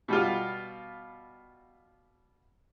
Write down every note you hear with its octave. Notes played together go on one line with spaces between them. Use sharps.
B2 G3 B3 F4